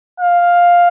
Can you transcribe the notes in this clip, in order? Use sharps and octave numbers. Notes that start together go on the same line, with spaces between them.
F5